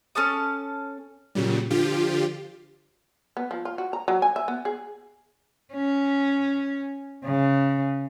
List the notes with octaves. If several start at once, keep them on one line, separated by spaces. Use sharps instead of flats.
C#4 A4 A5 D#6
A#2 C#3 F#3 G3
D3 F3 F4 G4
B3
F3
F4
F#4
A#5
F#3
G#5
E5
B3
G#4
C#4
C#3